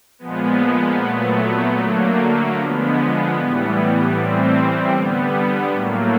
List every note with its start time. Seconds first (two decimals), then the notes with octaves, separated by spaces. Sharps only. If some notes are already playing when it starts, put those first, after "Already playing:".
0.18 A#2 F3 G#3 B3
0.97 A#2 F#3 A3
1.76 D3 F#3 A3 A#3
2.56 D3 F3 G#3 B3
3.35 A2 E3 G3
4.14 A2 E3 G3 C4
4.93 D3 G3 B3
5.72 A2 F#3 A3 A#3